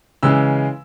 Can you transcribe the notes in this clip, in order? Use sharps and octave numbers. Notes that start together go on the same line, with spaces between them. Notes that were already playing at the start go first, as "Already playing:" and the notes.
C#3 E3 G#3 E6